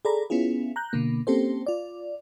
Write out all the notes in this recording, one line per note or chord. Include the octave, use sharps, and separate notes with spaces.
G#4 A4 D5 A#5 B5
B3 C#4 E4 F4 G#4
A#5 F#6 G6
B2 D3 A#3
A#3 C4 C#4 G4 A4 C5
F4 D5